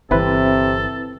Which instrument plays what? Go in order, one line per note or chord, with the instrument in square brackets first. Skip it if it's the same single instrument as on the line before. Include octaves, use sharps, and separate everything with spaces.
[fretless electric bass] G1 E3 [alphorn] C3 [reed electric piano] C4 E4 B4 [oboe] A4